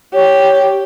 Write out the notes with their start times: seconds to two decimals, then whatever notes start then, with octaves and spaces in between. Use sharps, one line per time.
0.14 G4 C#5